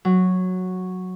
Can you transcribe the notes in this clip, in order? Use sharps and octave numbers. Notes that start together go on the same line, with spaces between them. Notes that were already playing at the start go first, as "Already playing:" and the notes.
F#3